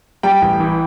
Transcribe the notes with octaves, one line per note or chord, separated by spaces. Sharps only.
G3 G5
A1
E3